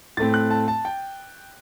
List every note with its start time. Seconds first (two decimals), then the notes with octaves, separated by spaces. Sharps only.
0.17 A2 A3 C4 A6
0.34 F#6
0.51 A5
0.68 A5
0.85 G5